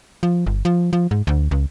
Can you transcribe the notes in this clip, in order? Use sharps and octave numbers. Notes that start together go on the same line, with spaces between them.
F3
G1
F3
F3
G#2
D2
C#2